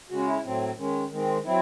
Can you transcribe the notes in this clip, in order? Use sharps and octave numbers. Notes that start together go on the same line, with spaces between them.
C#3 G#3 C#4 F#4
E4
A2 F#3 C4
D#3 G#3 C#4
D#3 G#3 C4
F#3 C4 E4